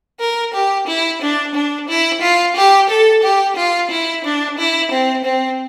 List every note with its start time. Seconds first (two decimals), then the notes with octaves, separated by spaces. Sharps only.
0.20 A#4
0.54 G4
0.88 E4
1.22 D4
1.55 D4
1.89 E4
2.22 F4
2.56 G4
2.89 A4
3.23 G4
3.56 F4
3.91 E4
4.25 D4
4.58 E4
4.92 C4
5.25 C4